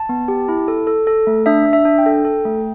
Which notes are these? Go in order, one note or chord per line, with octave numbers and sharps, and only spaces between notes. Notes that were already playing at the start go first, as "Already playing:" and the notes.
Already playing: A5
B3
G4
E4
A4
A4
A4
A3
D4 E5
D4
E5
D4
G5
A4
A4
A3